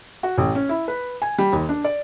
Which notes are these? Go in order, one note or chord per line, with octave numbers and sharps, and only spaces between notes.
F#4
A1
C#4
E4
B4
G#5
G3
D#2
D4
D5